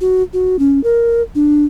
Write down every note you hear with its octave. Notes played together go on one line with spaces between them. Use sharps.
F#4
F#4
C#4
A#4
D4